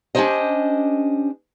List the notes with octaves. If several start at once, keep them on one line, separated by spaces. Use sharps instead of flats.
C#4 D4 F4 G4 C5 D#5